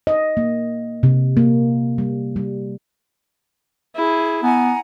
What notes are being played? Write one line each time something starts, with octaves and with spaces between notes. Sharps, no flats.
D#5
A#3
C3
A#3
G3
G3
E4 G#4
B3 F#5 G#5 A#5